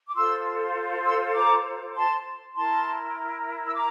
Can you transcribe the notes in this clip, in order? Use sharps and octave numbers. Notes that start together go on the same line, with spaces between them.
D6
F4 A4 C5 C6 E6
C6 E6
A#5 D6
A5 C6
E4 A#4 A5 C6
E6
A#5 D6